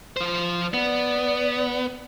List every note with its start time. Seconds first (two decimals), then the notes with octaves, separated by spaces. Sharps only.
0.17 F3 C5
0.74 B3 D5